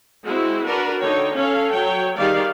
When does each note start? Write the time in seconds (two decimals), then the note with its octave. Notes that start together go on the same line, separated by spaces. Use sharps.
0.25 G#3 C4 E4 F#4
0.66 D4 F#4 A#4 B4
1.02 D3 D#4 C#5 G5
1.36 C#4 A4 C#5 F5
1.72 F#3 C#5 G5
2.18 D#3 G3 G4 G#4 D5 F5